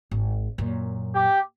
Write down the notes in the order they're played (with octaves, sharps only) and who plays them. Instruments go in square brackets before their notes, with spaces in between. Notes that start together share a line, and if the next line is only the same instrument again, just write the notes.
[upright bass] G#1
F#2 A#2
[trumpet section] G4